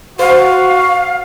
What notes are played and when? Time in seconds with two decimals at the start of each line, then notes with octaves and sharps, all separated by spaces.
0.19 F#4 C5 F5